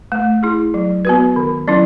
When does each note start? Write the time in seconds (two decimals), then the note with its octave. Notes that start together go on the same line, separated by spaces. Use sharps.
0.12 A3
0.43 E4 G#4
0.74 F#3
1.05 B3 F#4 B4
1.36 D#3
1.68 F#3 C#4 E4